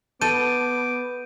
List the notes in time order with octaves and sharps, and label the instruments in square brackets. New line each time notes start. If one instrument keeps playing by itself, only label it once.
[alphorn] B3 [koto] A4 [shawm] D6 [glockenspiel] G6 D#7